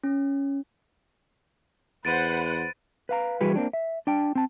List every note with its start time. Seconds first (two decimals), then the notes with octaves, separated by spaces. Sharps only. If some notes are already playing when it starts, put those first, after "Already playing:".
0.03 C#4
2.05 E2 B4 C5 F#5 A6 D7 D#7
3.09 B4 F5 A#5
3.41 E3 G3 F#4 G#4 B4
3.56 A#3 C4 D4
3.73 E5
4.07 D4 G5 A5
4.35 C4 A5